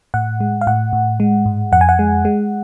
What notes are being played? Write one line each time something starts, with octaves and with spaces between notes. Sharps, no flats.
A2 F#5
G#3
F5
A2 F#5
A2
G#3
G#2
F2 F#5
G#5
F#5
G#3
G#3